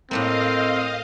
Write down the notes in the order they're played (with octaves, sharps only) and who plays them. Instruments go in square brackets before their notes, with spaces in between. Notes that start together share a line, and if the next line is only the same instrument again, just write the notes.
[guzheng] A2 A3 A#3 [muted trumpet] C4 [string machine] D#5 F5